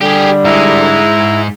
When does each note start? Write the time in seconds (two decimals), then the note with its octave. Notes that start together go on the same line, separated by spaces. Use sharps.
0.01 D3 G3 G4 G#4
0.45 G#2 G#3 E4 A#5